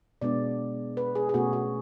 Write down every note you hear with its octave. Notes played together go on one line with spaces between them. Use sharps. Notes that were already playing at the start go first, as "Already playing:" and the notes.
B2 G#3 B3 D4 D5
B4
G#4
G#4
B2 A3 C#4 F#4
F#4